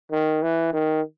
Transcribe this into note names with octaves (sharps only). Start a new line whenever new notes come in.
D#3
E3
D#3